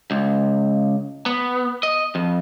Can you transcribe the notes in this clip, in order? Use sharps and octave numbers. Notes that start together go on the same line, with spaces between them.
C#2
B3
D#5
F2